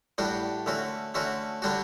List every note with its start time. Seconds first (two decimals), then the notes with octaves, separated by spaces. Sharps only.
0.18 A2 G3 D4 F#4
0.66 D3 A3 C#4 F#4
1.14 D3 A3 C#4 F#4
1.62 D3 G3 D4 F#4